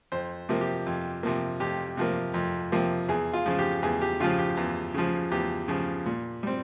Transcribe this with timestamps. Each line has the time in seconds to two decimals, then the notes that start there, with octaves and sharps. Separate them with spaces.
0.12 F2 C5
0.49 C3 F3 A#3
0.61 G4
0.87 F2
1.23 C3 F3 A#3
1.60 F2 G4
1.97 C3 F3 A#3
2.34 F2
2.72 C3 F3 A#3
3.09 E2 G#4
3.34 F4
3.46 C#3 F3
3.59 G4
3.83 E2 G#4
4.01 G4
4.20 C#3 F3 F4
4.39 G4
4.57 E2
4.94 C#3 F3
5.31 E2 G4
5.68 C#3 F3
6.06 A#2
6.43 G3 C4